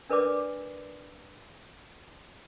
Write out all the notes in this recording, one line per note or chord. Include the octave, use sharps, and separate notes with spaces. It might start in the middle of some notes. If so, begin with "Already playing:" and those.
D4 A#4 B4 D5 D6